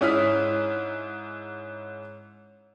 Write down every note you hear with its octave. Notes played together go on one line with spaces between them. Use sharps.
G#2 C#4 E4 D#6 F6 B6